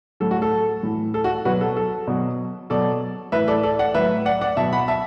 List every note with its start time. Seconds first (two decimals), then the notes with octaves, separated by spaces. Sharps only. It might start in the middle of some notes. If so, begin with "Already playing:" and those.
0.20 A2 F#3 A4
0.31 F#4
0.42 A4
0.83 A2 E3
1.14 A4
1.24 F#4
1.45 B2 F#3 F#4 B4
1.61 A4
1.77 A4
2.07 B2 F#3
2.70 B2 F#3 A4 D5
3.32 A2 E3 B4 E5
3.47 A4 D5
3.63 A4 D5
3.79 D5 F#5
3.94 A2 F#3 B4 E5
4.25 D5 F#5
4.41 D5 F#5
4.57 B2 E5 A5
4.60 F#3
4.73 F#5 B5
4.88 E5 A5